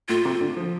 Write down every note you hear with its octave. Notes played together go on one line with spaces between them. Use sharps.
A2 F4
C3
D3
F3